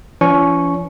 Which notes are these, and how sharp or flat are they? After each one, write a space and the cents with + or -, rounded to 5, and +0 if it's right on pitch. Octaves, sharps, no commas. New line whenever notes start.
F3 -45 C#4 +35 C#6 +0